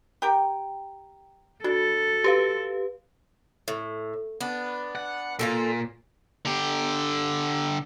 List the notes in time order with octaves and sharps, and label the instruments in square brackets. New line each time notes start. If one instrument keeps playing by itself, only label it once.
[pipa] G4 A#4 G5
[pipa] D4 [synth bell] F#4 [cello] A4
[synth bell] G4 B4 F5
[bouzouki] A2
B3 D4
[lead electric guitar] F#5
[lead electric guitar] A#2 [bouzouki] F4 G4 A4
[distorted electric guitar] D3 G4